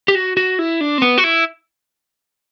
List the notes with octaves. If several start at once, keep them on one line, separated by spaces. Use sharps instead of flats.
G4
F#4
F#4
E4
D4
C4
B3
F#4
E4